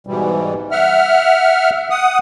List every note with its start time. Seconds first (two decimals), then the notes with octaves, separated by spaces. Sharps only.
0.07 G#2 B2 E3 G3
0.71 E5 F#5 F6
1.90 F#5 D#6